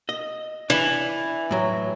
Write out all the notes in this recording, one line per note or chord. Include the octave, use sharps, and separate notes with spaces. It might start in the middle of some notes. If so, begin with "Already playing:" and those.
D#5
E3 D4
A2 F#3